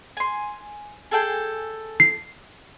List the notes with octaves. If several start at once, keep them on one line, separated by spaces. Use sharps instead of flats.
G#5 C6
G#4 A4 G5
C7